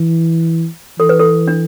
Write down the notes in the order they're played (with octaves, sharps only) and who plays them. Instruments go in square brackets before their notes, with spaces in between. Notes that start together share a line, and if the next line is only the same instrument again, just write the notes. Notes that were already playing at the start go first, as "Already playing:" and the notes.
Already playing: [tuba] E3
[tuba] E3 [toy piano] A4
[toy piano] B4
A4
D4